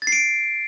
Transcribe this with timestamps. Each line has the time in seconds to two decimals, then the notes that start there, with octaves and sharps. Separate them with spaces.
0.02 A6
0.07 C7
0.12 D7